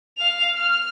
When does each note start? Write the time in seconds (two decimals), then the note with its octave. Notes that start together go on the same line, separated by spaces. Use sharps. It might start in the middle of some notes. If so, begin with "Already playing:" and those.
0.18 F5 F7
0.56 F6